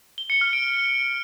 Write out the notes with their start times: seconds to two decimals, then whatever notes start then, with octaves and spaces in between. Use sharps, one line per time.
0.18 G7
0.30 C#7
0.41 F6
0.53 D7